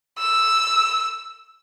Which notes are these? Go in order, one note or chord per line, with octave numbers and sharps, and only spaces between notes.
E6